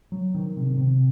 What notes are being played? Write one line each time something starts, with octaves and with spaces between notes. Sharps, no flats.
F#3
D#3
C3
C3